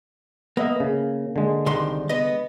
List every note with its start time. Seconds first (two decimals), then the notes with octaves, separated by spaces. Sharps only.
0.57 A#3 B3 D#5 E5
0.80 C#3
1.36 D3 G#3
1.66 C2 D#3 C6
2.09 B3 D#5